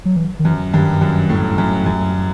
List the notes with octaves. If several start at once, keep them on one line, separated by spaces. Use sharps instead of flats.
F#3
E3
D#3
F#2 E3
G2 D#3
F#2
A2
F#2
F#2